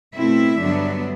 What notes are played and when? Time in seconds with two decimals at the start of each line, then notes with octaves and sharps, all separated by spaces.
0.16 B2 A3 C4 E4 E5
0.60 G2 D3 F#3 B3 D4